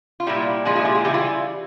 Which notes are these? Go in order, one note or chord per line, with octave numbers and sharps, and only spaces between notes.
F4
A#2 G3 E4 G4
A#2 F3 G#3 F4 G#4
F4 G#4
E4 G4
F4 G#4
C#3 E3 G3 E4 G4
F4 G#4